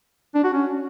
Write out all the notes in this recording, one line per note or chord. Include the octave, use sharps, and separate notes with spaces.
D4
F#4
C#4